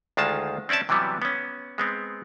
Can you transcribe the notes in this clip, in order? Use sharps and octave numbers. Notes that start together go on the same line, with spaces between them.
D2 D#3 G#3 F4 A5
C4 C#4 D5 E5 A5
C3 E3 F#3 G3 B3
B3 C#4
G#3 B3 C4